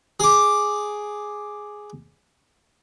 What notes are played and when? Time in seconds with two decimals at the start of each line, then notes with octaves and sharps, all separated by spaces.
0.20 G#4 D6